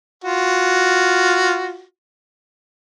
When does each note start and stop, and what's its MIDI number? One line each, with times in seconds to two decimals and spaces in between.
0.24 1.82 65
0.24 1.82 66